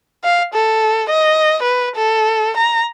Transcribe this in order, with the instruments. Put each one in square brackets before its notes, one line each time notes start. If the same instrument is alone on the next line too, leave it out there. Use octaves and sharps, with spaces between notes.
[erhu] F5
A4
D#5
B4
A4
A#5